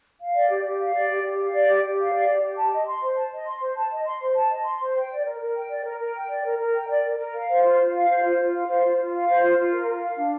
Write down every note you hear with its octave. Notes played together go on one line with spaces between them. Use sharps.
F5
D5
G4
G4
F5
D5
G4
G4
F5
D5
G4
G4
F5
D5
G4
G4
A5
D#5
C6
C5
A5
D#5
C6
C5
A5
D#5
C6
C5
A5
D#5
C6
C5
G5
D5
A#4
A#4
G5
D5
A#4
A#4
G5
D5
A#4
A#4
G5
D5
A#4
A#4
F5
C5
F4
F4
F5
C5
F4
F4
F5
C5
F4
F4
F5
C5
F4
F4
A#4
F4
F5
D4